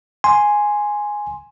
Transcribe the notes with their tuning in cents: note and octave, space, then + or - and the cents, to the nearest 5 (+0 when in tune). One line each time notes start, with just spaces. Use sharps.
G#5 +0 C6 +0